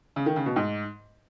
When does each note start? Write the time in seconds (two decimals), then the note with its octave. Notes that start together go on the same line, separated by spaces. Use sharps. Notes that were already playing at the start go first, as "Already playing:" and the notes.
0.16 C#3
0.26 D#3
0.36 C#3
0.46 B2
0.56 G#2